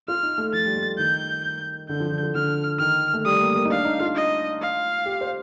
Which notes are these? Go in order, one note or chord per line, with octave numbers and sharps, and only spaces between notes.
F4 F6
D#4
A3
F3 A6
G3
A3
D#3 G6
D3 G6
F3
D3
F3
D3 F6
D#3 F6
A3
G3 D#6
A#3
A#3
D#4
D4 F5
D#4
F4
D#5
F5
G4
C5